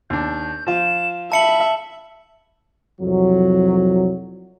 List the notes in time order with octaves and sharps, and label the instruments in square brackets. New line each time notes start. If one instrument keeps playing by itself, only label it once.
[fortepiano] D#2 D4 [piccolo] G6
[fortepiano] F3 F4 [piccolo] E7
[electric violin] E5 [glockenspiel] A5 C#7 F#7 [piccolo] B5
[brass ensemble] C2 F2 F#3